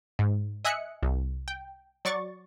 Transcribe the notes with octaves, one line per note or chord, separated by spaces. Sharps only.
G#2
D#5 E5 G#5 D#6 F#6 C#7
C2
G5
F#3 D5 C#6 A6